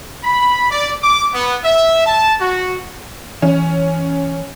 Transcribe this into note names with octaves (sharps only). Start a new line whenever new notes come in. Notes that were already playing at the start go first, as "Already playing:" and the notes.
B5
D5
D6
B3
E5
A5
F#4
E3 C#4